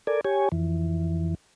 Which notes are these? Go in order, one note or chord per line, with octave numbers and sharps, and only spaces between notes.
A4 A#4 D5 G#5
G4 C#5 G#5
F2 E3